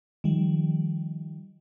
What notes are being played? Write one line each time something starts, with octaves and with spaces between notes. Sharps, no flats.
D#3 F3 G3